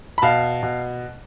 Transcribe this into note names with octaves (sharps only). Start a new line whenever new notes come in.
B5
B2 F5 A5
B2